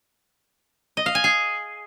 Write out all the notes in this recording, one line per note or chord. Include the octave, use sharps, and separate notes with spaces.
D#5
F5
G#5
G#4